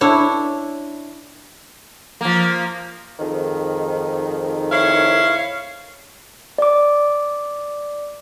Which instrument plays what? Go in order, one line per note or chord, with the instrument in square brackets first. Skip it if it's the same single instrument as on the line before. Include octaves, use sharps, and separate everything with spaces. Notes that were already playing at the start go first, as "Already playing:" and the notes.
[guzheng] D4 E4 C#5
[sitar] F3 A#3
[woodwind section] F2 G#2 D#3
[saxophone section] E4 C#5 F5
[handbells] D5 D6